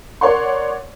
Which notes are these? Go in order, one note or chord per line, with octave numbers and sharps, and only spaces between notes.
A#4 C#5 D5 F#5 C6